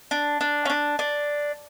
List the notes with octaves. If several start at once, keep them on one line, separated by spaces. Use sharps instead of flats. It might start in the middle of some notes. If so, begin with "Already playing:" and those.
D4
D4
C#4
D4
D4